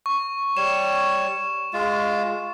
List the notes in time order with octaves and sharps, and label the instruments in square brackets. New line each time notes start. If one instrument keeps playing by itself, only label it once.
[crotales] C#6
[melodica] G3 C#5 [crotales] E7
[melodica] G#3 F4